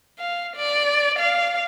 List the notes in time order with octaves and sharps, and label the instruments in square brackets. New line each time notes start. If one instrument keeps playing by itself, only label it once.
[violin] F5
D5
F5